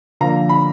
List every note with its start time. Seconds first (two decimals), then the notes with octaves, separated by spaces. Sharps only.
0.21 D3 F3 A#3 A#5
0.49 B5